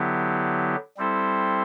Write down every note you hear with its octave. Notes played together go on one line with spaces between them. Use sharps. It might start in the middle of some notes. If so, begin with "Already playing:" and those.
Already playing: D3 F#3 B3 E4 G4
G3 C4 E4 A4 C5